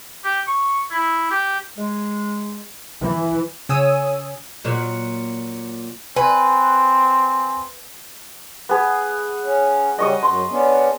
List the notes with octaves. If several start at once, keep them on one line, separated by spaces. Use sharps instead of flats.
G4
C#6
E4
G4
G#3
E3
C#3 C#5 G#5 D#6 E6 D#7
A#2 F#3 A#3
C4 B4 G#5
B3 G#4
C#4
C#3 G3 D#5 C#6 D#6
F#2 C6
B3 C#4 D4